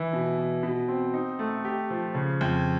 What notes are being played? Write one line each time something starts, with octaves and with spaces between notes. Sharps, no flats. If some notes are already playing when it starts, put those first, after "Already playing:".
Already playing: E3
B2
B2
B2
C4
D#4
A3
G4
F3
C#3
F2